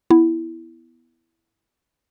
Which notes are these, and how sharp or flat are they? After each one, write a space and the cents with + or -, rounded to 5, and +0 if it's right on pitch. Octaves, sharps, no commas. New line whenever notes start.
B3 +0 E4 +0